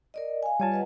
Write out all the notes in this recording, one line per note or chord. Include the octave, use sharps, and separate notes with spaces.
A#4 D5 D#5
F5 G#5
G3 F4 C#5 G#5 A5
B4 D#5 F#5